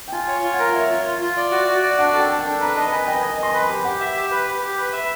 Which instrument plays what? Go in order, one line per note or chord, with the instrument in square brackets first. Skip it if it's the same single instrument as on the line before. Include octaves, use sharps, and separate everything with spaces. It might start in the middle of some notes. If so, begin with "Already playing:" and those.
[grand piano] G5
[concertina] F4 [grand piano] G#5
[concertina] C#5
F4
[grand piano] F#5
[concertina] A#4
[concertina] C#5 [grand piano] E5
[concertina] F4
F4
F4
D5
F#4
F#4
D5
[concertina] D4 [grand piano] F#5
[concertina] A4
[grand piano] G5
[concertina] A4
[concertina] D4 [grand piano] G5
[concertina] B4 [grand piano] A#5
[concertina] D#5 [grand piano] A5
[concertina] B4 [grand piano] G#5
[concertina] D#5 [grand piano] G5
[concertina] D#5 [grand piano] G#5
[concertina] D#5 [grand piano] C6
[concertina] B4
[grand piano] B5
[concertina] G4
[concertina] G4 [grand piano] F#5
[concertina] E5
G4
B4
G4
G4
B4
E5